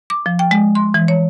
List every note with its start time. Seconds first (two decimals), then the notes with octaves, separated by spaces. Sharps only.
0.10 D6
0.26 F3
0.39 G5
0.51 G#3
0.75 C6
0.94 E3
1.08 C#5